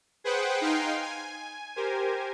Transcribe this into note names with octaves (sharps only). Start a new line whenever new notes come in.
G#4 B4 C5 F#5 G5
D#4 F5 G5 G#5 C6
G#5
G4 A#4 C5 G#5